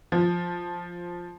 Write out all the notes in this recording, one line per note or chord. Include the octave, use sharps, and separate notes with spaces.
F3